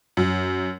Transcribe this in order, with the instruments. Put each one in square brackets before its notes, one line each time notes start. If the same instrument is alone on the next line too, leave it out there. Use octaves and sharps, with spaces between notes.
[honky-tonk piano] F#2